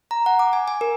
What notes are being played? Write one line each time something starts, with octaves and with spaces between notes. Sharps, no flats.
A#5
F#5
D6
G#5
G#5
A#4